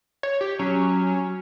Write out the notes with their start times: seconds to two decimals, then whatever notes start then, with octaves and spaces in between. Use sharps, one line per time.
0.23 C#5
0.41 G4
0.59 F#3 C#4